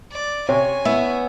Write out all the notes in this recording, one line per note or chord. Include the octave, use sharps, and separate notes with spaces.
D5
C3 C#5 G#5
B3 E4